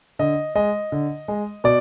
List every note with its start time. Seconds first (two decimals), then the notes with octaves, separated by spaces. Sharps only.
0.19 D3 D#5
0.55 G#3 D#5
0.92 D3
1.28 G#3
1.64 B2 D5